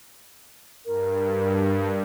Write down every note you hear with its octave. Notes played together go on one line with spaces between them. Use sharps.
G2 A#4